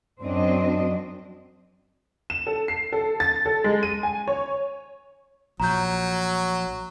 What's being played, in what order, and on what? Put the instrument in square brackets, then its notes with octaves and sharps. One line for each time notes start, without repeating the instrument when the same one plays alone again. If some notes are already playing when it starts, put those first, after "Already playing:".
[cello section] F#2 F#3 C4 D4 D#5
[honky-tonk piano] E7
A4
C7
A4
A6
A4
G#3
D#7
G#5
C#5
[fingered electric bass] A#1 [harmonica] F#3 [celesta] A#5 G6